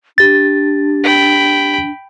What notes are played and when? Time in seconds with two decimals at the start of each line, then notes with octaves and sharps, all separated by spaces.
0.18 D4 G4 A6
1.04 G5 B5